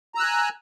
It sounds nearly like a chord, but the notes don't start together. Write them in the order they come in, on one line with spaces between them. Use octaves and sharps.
A#5 E6 F#6 G#5